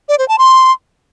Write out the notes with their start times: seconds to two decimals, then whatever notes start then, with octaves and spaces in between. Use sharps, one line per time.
0.09 D5
0.18 C5
0.28 A5
0.38 C6